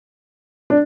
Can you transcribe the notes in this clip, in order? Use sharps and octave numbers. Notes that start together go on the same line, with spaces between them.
D4